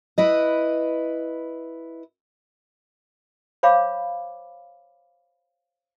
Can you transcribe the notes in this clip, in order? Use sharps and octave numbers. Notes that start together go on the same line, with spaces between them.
E4 B4 D#5
C5 C#5 F5 B5 D6